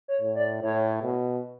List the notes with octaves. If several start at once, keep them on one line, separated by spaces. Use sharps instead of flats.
C#5
A2
D5
A2 C#5
B2